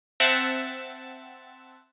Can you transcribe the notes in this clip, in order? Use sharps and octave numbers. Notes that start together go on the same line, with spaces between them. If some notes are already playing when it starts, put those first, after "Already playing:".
C4 E5 F#5 A5